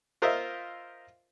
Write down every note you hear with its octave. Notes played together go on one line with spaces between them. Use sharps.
F4 A#4 C5 D#5 E5